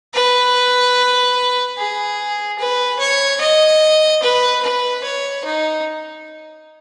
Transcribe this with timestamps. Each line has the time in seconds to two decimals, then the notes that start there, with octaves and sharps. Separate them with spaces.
0.14 B4
1.77 G#4
2.59 B4
2.99 C#5
3.40 D#5
4.22 B4
4.63 B4
5.04 C#5
5.45 D#4